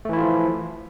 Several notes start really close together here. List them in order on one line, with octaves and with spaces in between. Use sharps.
A3 E3 E4 F4 F3